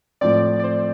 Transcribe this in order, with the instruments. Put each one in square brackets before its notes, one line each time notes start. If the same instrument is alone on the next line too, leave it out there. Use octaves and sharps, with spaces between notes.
[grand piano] A2 F3 C4 [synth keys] D5
[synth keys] D5
C5